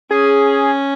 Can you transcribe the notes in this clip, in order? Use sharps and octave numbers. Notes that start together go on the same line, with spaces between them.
C#4 G#4